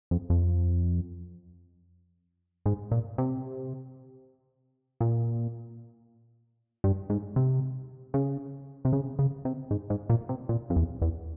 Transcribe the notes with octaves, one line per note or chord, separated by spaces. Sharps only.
F2
F2
G#2
A#2
C3
A#2
G2
G#2
C3
C#3
C3
C#3
C#3
C3
G#2
G#2
A#2
C3
A#2
F2
E2
E2